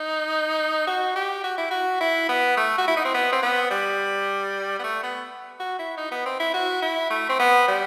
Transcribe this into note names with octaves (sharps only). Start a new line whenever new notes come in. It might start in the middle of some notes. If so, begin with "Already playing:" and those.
Already playing: D#4
F#4
G4
F#4
E4
F#4
E4
B3
A3
F#4
E4
D#4
C4
B3
C4
B3
G3
B3
A3
B3
F#4
E4
D#4
B3
C4
E4
F#4
E4
A3
C4
B3
G3